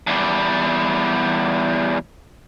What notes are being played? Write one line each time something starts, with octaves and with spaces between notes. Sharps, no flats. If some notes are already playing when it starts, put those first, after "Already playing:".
E2 G3